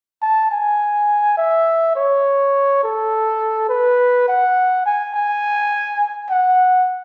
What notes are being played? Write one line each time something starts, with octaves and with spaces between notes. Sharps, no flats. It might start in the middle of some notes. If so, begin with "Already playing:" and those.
A5
G#5
E5
C#5
A4
B4
F#5
G#5
G#5
F#5